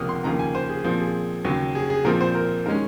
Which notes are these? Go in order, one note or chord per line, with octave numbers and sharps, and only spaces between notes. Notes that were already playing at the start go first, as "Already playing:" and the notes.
Already playing: C#2 C3 F3 A#3 C#4 D#6 F6
C6
D#2 C#3 F3 A#3 A#5
G#5
C5
G#4
A#2 F3 C4
G#4
D#2 C#3 F#3
G#4
G#4
A#2 F3 C4 A#4
C5
A#4
D#3 G#3 C#4 A#4